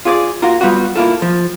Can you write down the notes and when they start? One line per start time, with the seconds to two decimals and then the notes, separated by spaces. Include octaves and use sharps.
0.05 F4 G#4 C#5 D5
0.42 A#3 F4 F#4 A#4
0.61 G3 B3 F4 F#4
0.96 A#3 E4 F4 A4
1.22 F3